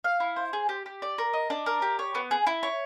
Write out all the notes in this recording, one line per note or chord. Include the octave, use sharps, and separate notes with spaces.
F5
E4
C5
G#4
G4
G4
D5
A#4
D#5
D4
A#4
G4
C#5
B3
G#4
E4
C#5